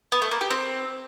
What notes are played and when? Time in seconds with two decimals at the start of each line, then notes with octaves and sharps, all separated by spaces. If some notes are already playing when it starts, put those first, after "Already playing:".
0.12 B3
0.22 A3
0.31 A#3
0.41 G4
0.51 C4